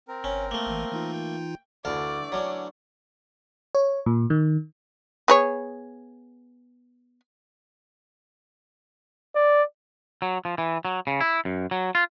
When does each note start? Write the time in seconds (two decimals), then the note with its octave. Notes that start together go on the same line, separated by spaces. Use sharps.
0.08 C4 A#4
0.24 G1 C#4
0.51 A3 A#3
0.67 G#1 E3
0.92 E3 D#4 F4
1.12 G5
1.85 D2 D3 E3 A3 D5 F5 A5
2.32 F#3 C#4 D4
3.75 C#5
4.06 A#2
4.30 D#3
5.28 B3 G#4 C#5
9.35 D5
10.22 F#3
10.45 F3
10.58 E3
10.85 F#3
11.07 C#3
11.21 E4
11.45 F#2
11.71 F#3
11.95 F4